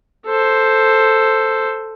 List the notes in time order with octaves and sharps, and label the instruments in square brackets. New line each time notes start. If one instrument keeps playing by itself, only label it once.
[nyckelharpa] A4 C5